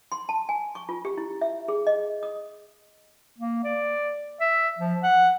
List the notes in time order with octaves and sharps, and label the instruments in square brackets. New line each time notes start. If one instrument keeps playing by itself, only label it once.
[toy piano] C6
A5
G#5
C#6
F4
G4
E4
E5
G#4
D#5
D#6
[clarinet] A#3
D5
E5
F3
F#5